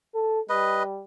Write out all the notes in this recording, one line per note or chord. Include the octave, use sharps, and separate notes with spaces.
A4
G3 B4 D#5